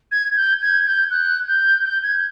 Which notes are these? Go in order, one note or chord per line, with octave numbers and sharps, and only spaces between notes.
G#6
G6
G#6
G6
F#6
G6
G6
G#6